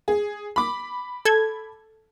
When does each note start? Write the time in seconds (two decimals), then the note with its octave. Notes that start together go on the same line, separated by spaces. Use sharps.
0.08 G#4
0.56 B5 D6
1.25 A4 G#6